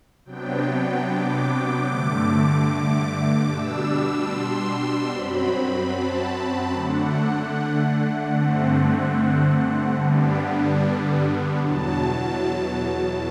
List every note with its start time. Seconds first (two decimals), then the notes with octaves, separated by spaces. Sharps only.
0.25 C3 F#3 B3 D4 G5
0.66 G5
1.06 D6
1.87 G2 D3 A3 D6
2.69 D6
3.49 B2 G3 D4 E6
4.30 C6
5.11 F#2 F#3 C4 B5
5.92 A5
6.73 D3 A3 D4 F#5
8.35 G2 D3 A3 C4
9.97 G2 D3 G3 B3 D4
11.58 E2 B2 F#3 A5